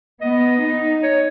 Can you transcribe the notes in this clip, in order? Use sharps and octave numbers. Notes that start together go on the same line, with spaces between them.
B3 D#5
D#4
C#5